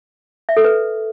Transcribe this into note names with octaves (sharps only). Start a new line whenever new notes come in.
E5
A4
B4